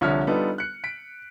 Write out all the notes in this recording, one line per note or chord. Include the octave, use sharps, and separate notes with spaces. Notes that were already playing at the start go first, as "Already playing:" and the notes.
C2 D3 F3 C#5 E5 F6
G3 B3 D4 D#4 F4 A4
F#6 C#7
B6 D7